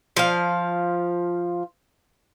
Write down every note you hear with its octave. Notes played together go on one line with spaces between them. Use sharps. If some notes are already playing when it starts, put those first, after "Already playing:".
F3 F5